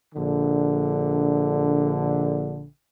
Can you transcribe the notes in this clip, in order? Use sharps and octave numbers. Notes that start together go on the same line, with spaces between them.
A#1 D3